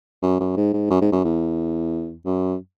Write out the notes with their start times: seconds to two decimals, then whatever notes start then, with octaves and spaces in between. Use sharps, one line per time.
0.22 F#2
0.40 F#2
0.56 G#2
0.73 G#2
0.90 F#2
1.02 G#2
1.12 F#2
1.24 E2
2.26 F#2